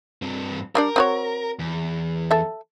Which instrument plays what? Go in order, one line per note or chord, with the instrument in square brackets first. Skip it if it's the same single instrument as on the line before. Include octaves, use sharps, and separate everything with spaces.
[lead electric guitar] G2 C4
[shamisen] G3 D4 D5 [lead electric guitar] A#4
[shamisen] C4 F#4 C#5
[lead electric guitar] E2
[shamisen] A4 E5